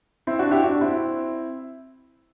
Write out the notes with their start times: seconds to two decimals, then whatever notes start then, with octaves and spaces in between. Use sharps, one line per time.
0.27 C4 E4
0.39 D4 F#4
0.51 E4 G4
0.64 D4 F#4
0.81 C4 E4